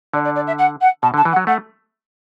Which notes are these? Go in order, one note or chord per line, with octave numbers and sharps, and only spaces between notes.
D3 D5
D5
D5
E5
F#5
F#5
B2 A5
D3
A5
E3
F#5
F#3
A3 F#5